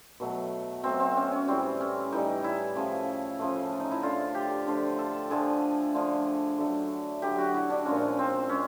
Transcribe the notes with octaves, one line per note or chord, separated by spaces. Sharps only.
B2 F#3 A3
B2 F#3 A3 C4
C4
C#4
C#4
A2 E3 G3 C4
C#4
A2 E3 G3 D#4
E4
C#3 F3 A3
C#3 F3 A3
D#4
E4
D3 F3 A3 F4
G4
D3 F3 A3
A4
D3 F3 A3 G#4
D3 F3 A3
D3 F#3 A3
D3 F#3 A3 G4
F#4
E4
D4
A#2 F3 G#3 C#4
C4
G#3 C#4